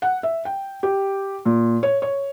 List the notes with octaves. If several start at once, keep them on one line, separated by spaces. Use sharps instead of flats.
F#5
E5
G5
G4
A#2
C#5
C#5